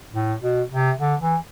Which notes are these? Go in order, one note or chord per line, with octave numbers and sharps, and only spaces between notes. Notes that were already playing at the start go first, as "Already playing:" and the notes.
A2
B2
C3
D3
E3